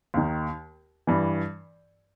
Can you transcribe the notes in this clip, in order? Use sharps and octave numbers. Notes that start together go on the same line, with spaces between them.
D#2 D#3
G2 E3